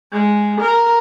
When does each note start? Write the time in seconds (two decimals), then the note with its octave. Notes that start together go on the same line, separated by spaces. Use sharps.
0.13 G#3
0.61 A#4